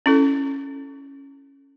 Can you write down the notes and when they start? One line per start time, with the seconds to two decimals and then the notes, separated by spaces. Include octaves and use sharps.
0.06 C#4 E4 A4